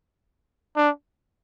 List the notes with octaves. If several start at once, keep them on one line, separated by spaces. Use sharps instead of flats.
D4